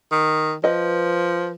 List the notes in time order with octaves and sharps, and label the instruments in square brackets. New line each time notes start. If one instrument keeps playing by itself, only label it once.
[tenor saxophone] D#3
[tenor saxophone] F3 [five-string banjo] B4 D#5